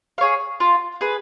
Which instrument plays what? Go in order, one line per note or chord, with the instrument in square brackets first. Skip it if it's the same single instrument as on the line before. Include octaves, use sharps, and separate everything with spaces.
[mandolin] G#4 C#5 F5
F4
G#4 B4